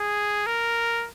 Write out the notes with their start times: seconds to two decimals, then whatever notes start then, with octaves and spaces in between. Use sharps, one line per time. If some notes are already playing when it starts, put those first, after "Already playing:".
Already playing: G#4
0.46 A#4